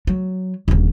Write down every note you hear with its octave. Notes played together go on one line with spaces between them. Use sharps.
F#3
D#1 D3